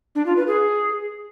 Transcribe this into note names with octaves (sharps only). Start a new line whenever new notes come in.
D4
F4
B4
G#4